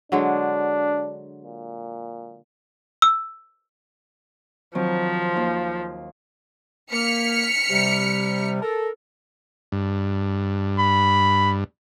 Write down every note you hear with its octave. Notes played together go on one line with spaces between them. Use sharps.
D3 F#3 G#3 D4
A#2
E6
D#3 F3 F#3 C4
D#2 D#4 F5
A#3 F6 B6 C#7
C3 G3
A4 A#4
G2
B5